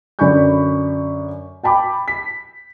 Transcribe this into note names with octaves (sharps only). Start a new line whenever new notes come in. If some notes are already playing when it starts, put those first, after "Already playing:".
F#2 D3 D5 B5 C#6 G6
G5 A5 B5 D6
B6